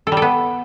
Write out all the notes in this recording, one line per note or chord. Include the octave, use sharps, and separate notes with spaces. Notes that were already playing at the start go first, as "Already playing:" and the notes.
A4
G3
A4
B3